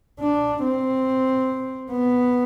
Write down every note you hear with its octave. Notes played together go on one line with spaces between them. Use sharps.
D4
C4
B3